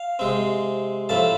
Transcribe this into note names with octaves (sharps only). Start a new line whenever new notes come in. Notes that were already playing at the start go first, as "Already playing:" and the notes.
Already playing: F5
C3 G#3 C4
A2 F3 A3 C4 A5